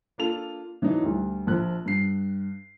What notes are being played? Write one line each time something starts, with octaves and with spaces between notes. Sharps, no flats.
A#3 D4 F4 A4 F7
E3 F#3 D4 D#4
D2 G3
A#1 F3 F#6
G2 C7